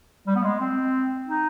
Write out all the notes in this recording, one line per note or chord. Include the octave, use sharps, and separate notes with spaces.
G3
B3
G#3
C4
D#4